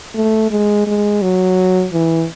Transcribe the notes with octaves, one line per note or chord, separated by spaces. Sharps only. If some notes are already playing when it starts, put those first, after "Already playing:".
A3
G#3
G#3
F#3
E3